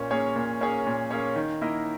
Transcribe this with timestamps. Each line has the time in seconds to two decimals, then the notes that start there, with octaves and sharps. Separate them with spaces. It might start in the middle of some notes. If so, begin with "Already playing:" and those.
Already playing: A#2 A#3 C#4 C#5
0.11 A#3 C#4 G#4 C#5
0.36 A#2
0.61 A#3 C#4 G#4 C#5
0.87 A#2
1.11 A#3 C#4 G#4 C#5
1.36 D#3
1.61 A#3 E4 A#4 D#5